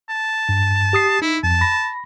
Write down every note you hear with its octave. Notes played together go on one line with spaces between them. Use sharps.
A5
G2
G4 D#6 C7
D#4 E4
F2 A5
B5 A#6